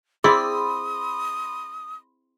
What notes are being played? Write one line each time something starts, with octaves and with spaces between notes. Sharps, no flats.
C4 E4 G#4 D5 B5 C6 D#6